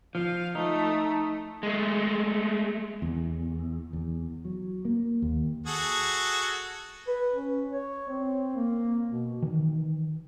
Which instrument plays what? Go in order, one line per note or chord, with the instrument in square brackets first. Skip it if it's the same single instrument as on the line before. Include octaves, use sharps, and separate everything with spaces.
[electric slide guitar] F3 [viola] F5
[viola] A3 [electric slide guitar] D#4
[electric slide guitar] G#3 A3
[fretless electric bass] E2
E2
F#3
A#3
D#2
[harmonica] F#4 G#4 A4
[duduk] B4
C#4
C#5
C4
A#3
B2
[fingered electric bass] D#3 E3